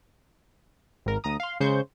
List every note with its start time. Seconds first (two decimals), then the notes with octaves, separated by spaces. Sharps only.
1.06 G#1 A#4
1.24 D2 A#5 D#6
1.40 F5 C6
1.60 C#3 G#3 C5 C#6 G6